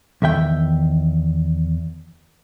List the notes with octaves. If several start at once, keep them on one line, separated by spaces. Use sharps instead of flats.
E2 D#3 E5 G5